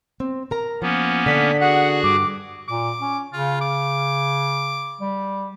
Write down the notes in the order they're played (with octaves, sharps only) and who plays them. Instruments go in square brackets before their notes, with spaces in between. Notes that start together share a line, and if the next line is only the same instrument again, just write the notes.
[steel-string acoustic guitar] C4
A#4 A#5
[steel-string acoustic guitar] F3 [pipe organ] A#3 B3 C#4
[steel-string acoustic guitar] D3 D4 D5 [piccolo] B6
[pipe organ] F#4 G#4 F#6 [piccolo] F#5
[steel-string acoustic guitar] G2 [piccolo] D6
[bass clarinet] A#2 [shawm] D6
[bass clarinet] C#4
[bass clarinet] C#3 [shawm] F4
[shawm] D6
[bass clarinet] G3